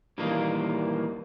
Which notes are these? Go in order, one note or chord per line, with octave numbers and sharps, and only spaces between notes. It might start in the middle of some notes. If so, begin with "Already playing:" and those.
A#2 D#3 E3 G3 A#3